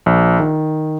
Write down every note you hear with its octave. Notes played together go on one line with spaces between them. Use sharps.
A#1
D#3